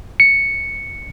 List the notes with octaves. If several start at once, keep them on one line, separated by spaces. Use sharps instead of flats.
C#7